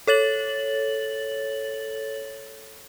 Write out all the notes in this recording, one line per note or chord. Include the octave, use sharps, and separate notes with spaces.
A4 C#5 A6 F#7